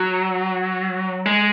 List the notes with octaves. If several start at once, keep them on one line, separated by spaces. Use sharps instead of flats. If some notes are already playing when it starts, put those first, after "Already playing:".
Already playing: F#3
G#3